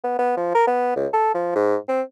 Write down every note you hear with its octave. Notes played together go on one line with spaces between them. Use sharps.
B3
B3
F3
A#4
B3
C#2
A4
F3
G#2
C4